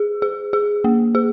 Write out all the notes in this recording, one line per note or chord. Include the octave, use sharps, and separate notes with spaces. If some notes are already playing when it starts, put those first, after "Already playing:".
Already playing: G#4
G#4
G#4
A#3
G#4